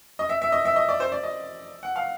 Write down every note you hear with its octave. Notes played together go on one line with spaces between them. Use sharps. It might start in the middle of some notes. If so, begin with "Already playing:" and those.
D#5
E5
E5
D#5
E5
D#5
D5
C5
D5
D#5
F#5
F5